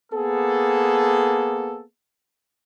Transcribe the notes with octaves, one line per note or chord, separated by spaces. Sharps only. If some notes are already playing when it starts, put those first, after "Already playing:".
A#3 B3 G#4 A4